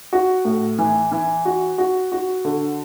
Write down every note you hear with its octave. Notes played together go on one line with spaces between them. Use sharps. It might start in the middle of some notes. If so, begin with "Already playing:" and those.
F#4
A2
E3
E3
F#4
F#4
F#4
D3